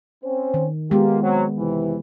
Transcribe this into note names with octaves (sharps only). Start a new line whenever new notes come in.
C4 C#4 C5
D#3
G#3 A#3 B3 F4 G4
F#3 C4
F2 C3 E3